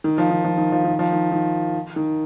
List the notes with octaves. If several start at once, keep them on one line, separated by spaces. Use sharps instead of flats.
D#3
F3
D#3
F3
D#3
F3
D#3
F3
D#3
D#3
D#3